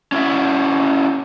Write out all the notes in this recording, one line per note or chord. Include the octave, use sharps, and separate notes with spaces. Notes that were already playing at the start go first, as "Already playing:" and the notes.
C#4 E4 F#4 E5